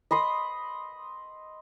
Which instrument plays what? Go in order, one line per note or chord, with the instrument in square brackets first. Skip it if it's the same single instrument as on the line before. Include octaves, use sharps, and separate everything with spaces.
[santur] D#5 B5 C6 D#6